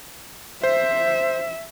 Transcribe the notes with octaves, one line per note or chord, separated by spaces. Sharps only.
C5 E5